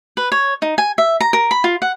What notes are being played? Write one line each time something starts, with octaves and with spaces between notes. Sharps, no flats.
B4
C#5
D#4
G#5
E5
A#5
A#4
B5
F4
F#5